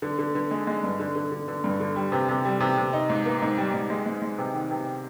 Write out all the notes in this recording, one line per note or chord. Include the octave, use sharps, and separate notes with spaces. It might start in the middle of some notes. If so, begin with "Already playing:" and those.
D3
D3
D3
G#3
G#3
G2
D3
D3
D3
D3
G2
D3
G3
C3
C3
G3
C3
C3
D#4
G#2
A#3
G#2
G3
G#2
G#3
G#3
G#3
C3
D#3
C3